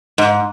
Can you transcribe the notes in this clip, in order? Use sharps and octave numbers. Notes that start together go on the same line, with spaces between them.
G#2